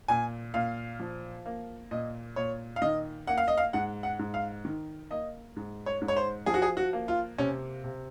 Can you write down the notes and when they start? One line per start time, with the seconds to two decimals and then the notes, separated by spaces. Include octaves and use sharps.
0.08 A#2 G#5
0.54 A#2 F5
1.00 F3
1.46 A#3
1.91 A#2 D#5
2.36 A#2 C#5
2.76 F5
2.82 D#3 D#5
3.27 A#3 F#5
3.38 F5
3.48 D#5
3.57 F5
3.73 G#2 F#5
4.03 F#5
4.19 G#2
4.34 F5
4.65 D#3
5.11 A#3 D#5
5.56 G#2
5.86 C#5
6.01 G#2
6.08 C#5
6.16 C5
6.46 F3 G#4
6.54 F#4
6.62 G#4
6.77 F#4
6.93 A#3
7.08 F4
7.38 C3 C#4
7.84 C3